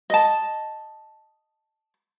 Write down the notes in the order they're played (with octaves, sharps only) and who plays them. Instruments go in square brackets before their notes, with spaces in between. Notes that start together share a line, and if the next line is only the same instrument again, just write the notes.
[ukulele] D#5 A5